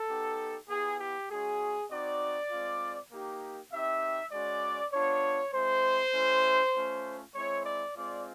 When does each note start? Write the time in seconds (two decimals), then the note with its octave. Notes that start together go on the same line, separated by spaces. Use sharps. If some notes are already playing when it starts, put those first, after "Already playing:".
Already playing: A4
0.08 B3 D#4 G4
0.68 B3 E4 G4 G#4
0.99 G4
1.29 G#3 C#4 F#4 G#4
1.90 C4 D#4 F#4 D5
2.50 G#3 C4 F4
3.11 A#3 D#4 G4
3.71 C4 D#4 G4 E5
4.31 G#3 C#4 F#4 D5
4.92 B3 D4 F4 C#5
5.53 G#3 C4 E4 C5
6.13 A3 C#4 E4 G4
6.74 A3 C#4 F4
7.34 G#3 C4 E4 C#5
7.65 D5
7.96 G#3 C4 F4 D5